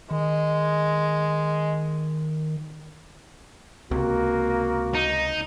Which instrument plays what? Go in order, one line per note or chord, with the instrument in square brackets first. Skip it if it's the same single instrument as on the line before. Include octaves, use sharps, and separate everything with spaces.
[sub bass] D#3 [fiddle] G#3
[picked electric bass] C#2 C3 [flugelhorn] A#3 [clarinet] F#4
[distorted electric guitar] D#4